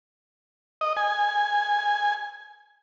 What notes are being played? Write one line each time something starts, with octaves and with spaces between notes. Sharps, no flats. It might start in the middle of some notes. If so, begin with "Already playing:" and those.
D#5
G#5